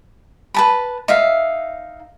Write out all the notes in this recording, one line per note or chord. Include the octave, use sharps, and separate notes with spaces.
B4 A5 B5
D#4 E5 F5